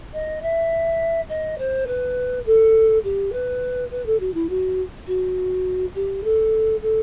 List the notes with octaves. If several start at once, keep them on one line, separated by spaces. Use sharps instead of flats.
D#5
E5
D#5
C5
B4
A4
G4
B4
B4
A4
F#4
E4
F#4
F#4
G4
A4
A4